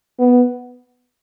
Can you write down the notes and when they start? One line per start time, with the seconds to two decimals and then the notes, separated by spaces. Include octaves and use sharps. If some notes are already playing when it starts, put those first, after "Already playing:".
0.19 B3